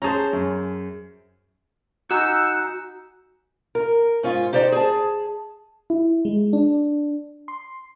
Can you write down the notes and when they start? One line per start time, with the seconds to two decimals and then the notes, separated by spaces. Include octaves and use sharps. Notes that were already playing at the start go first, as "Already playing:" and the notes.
0.02 C#4 G#4 C5 A5 A#5
0.33 F#2
2.11 D#4 F#4 F#5 G#5 E6
3.75 A#4
4.23 G#2 C#4 F4
4.53 D#4 G4 C5 D5 A#5
4.72 G#4 A5
5.90 E4
6.25 G#3
6.53 D4
7.48 C6